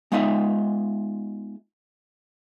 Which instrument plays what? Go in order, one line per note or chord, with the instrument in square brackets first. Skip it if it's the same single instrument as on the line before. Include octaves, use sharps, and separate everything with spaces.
[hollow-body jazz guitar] G#3 B3 D#4 F4 D#5 E5